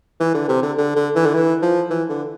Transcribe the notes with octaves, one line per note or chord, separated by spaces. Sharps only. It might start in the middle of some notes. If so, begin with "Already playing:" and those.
E3
D3
C3
D3
D3
D3
E3
D3
E3
F3
E3
D3